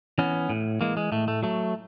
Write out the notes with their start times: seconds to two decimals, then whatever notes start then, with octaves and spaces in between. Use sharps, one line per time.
0.18 E3 B3 C#4
0.50 A2
0.81 E3 G#3 A#3
0.97 G#3
1.12 A2 A3
1.28 A3
1.43 F#3 A3